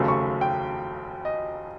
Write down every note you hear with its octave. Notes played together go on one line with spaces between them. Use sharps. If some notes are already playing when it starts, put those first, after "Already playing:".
Already playing: F1 D#2 C#3 F#3 A3
C#6
G5
D#5